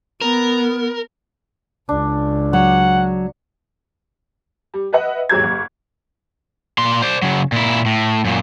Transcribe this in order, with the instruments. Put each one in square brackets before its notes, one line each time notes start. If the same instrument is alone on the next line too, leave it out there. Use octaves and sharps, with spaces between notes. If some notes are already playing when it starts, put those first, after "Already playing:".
[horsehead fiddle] B3 [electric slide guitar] A#4
[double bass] C#2 [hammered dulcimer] D4
[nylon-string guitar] F#3 [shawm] F#5 [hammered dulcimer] C#6
[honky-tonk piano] G3
B4 D#5 E5 F#5
D#2 G#2 F#3 G#6
F#1
[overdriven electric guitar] A#2 C6
C5 D5
C#3 F#3
A#2 E4
A2
F#2 A#2